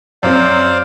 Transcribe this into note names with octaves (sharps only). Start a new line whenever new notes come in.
F#2 C4 C5 D5 F5